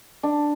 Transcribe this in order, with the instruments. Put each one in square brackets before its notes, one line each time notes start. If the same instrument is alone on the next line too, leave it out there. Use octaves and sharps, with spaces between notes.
[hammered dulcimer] D4